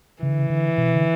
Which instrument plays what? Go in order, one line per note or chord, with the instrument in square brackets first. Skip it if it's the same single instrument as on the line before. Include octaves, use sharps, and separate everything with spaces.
[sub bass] C#3 [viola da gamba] E3
[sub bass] D3
C#3
D3
B2
D3